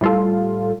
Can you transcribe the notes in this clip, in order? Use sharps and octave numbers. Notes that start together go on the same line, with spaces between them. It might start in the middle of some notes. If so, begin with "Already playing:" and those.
A2 G3 F4 A4